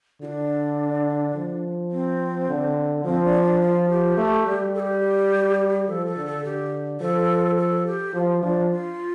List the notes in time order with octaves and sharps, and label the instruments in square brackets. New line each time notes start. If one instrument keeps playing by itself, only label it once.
[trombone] D3 [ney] F4
[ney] D4
[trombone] F3
[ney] C4
[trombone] D3
[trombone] F3 [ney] C4
[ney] D4
D4
F4
G4
[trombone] A3
G3
[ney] A4
G4
[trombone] F3 [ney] A4
[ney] A4
[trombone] D3
[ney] A4
[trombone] D3 [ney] G4
[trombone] F3 [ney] A4
[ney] A4
G4
[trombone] F3 [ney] F4
[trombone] F3 [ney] D4
[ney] F4